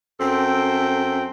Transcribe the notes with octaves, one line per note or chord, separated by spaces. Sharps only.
F#2 C4 A4 G5